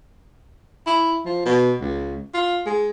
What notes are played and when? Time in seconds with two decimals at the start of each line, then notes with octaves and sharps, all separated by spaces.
0.87 E4
1.25 F3
1.46 B2
1.81 C#2
2.34 F4
2.66 G#3